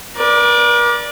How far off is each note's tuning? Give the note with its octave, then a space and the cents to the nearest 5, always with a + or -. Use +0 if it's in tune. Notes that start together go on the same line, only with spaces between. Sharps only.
A#4 +45 D5 +0